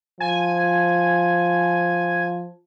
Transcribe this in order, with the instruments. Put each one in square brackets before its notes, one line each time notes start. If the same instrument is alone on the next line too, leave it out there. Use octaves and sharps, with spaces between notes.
[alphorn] F3 [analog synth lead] G#5